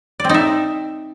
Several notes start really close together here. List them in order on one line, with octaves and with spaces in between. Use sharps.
D5 C4 D#4 E5